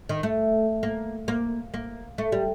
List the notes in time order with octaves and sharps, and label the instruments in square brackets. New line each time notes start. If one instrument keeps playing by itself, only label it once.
[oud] D#3
A3
A#3
A#3
A#3
A3
G3